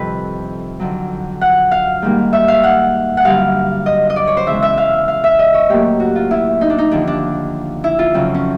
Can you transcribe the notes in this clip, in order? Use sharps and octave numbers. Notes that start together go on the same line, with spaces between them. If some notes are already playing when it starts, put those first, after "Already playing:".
Already playing: F2 C3 D#3 G3 A4 B4
F2 D3 F#3
F#5
F5
G#2 D#3 G3 A#3
E5
F5
F#5
F#5
G2 D3 F#3 F5
D#5
D#5
D5
C#5
C5
E2 C#3 E3 G#3 E5
E5
F5
F5
E5
D#5
C#5
A2 F#3 A#3 G4
F#4
F4
E4
D#4
D4
D#4
D#2 D3 F3 D4
D4
E4
F4
F2 C#3 F#3
C#4